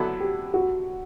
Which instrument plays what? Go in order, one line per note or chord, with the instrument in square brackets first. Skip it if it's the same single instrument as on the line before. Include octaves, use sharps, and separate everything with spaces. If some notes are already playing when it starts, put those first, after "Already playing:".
Already playing: [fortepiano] D3 F#3 B3 E4 A4 [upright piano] F#4
[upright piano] G4
F#4